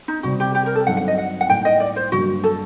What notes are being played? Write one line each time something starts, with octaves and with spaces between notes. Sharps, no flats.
D#4
C3 G3 C4 F#4
G4
G4
A#4
A4
G2 D3 F#3 C4 D#4 F#5
F#5
D#5
F#5
F#5
A2 G3 A#3 D#4 G5
D#5
D5
C5
G2 D3 F#3 A#3 F#4
A4